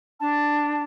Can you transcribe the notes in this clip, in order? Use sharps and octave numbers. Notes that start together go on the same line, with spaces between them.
D4 A5